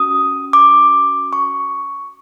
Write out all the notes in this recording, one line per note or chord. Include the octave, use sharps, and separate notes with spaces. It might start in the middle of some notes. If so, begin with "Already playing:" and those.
Already playing: C#4 F#4 D#6
D6
C#6